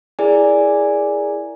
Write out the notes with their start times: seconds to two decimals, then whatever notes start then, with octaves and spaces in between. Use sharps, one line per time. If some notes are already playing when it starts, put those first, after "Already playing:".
0.19 E4 G#4 A#4 D5 G#5